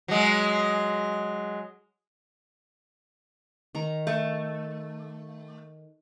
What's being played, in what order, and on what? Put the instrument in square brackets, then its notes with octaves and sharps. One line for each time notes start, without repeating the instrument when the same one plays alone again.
[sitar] F#3 G#3
[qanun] D#3 A#5
[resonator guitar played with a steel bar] A3